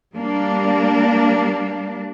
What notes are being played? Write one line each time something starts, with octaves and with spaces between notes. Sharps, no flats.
G3 A#3 D4